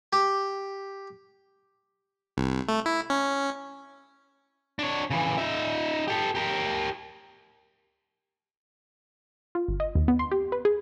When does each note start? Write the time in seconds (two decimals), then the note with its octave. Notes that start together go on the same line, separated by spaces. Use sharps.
0.13 G4
2.37 C2
2.68 A3
2.86 E4
3.10 C#4
4.79 D4 C#5
5.10 C#3 E3
5.38 D#4 E5
6.08 G4 A4
6.35 G4 A#4
9.55 F4
9.68 G1
9.80 D#5
9.95 D#2
10.08 B3
10.19 C6
10.32 G4
10.52 B4
10.65 G#4